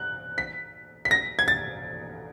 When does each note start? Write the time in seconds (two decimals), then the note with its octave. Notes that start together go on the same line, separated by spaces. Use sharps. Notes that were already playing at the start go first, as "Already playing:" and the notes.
Already playing: F#6
0.38 B6
1.05 B6
1.11 A#6
1.39 G#6
1.48 A6